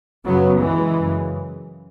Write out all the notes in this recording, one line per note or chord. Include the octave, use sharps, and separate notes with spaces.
F#2 C#3 F#3 B3
E3 G#3
F#2 C#3